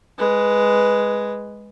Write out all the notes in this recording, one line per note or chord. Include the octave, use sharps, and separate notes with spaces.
G#3 B4